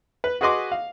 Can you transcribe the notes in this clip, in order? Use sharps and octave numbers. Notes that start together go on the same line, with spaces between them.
B4
F#4 G#4 B4 D#5 C6 D6
F5